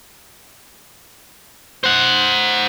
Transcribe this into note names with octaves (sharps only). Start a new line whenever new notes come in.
C5 F#5